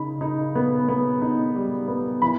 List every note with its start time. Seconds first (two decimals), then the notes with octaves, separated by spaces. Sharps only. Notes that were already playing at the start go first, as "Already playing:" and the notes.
Already playing: C#3 D#4 B5
0.21 D#4
0.55 B3
0.89 B3
1.22 D#4
1.56 G3
1.88 B3
2.22 E3 B5